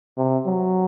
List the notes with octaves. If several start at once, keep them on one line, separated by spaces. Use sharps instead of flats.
C3
F#3